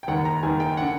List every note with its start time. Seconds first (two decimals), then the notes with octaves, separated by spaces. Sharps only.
0.03 G5
0.08 D#2 D#3 F#5
0.25 A#5
0.43 D#2 D#3 G#5
0.60 G5
0.77 D3 F#5